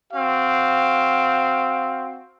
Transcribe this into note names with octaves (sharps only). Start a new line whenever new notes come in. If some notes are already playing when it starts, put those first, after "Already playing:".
C4 F#4 F5